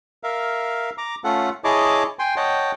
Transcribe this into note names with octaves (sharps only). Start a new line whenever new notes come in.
A#4 E5 F5
A#5 D6
A3 C#4 F4 A4 F#5
E4 G#4 C#5 D#5 A5 D6
G5 G#5 C6
C#5 D#5 F#5 G5 A5